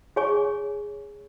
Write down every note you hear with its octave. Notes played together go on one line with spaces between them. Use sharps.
G#4 C#5 G#5 C#6